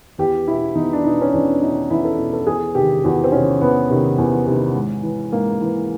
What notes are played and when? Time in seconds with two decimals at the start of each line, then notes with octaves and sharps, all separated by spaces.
0.18 E2 G4
0.48 B2 E4
0.75 E2 D#4
0.93 D4
1.04 B2 D#4
1.21 C#4
1.33 E2 D4
1.61 B2 D#4
1.90 E2 E4
2.05 A4
2.19 B2
2.33 A4
2.47 E2 G#4
2.75 C3 D#3 G4
3.04 E2 F#4
3.24 C4
3.32 C3 D#3 C#4
3.61 E2 B3
3.90 C3 D#3
4.18 E2
4.46 C3 D#3
4.75 G#2
5.03 E3
5.32 G#2 A#3
5.61 E3